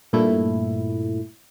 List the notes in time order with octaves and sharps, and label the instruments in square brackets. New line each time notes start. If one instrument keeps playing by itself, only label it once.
[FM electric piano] G2 A#2 A3 E4